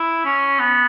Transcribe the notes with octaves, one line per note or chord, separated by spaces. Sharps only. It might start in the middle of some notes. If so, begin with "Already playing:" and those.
Already playing: E4
C#4
B3